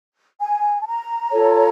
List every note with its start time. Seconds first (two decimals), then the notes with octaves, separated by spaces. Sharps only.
0.41 G#5
0.80 A5
0.86 A#5
1.32 F4 A4 C#5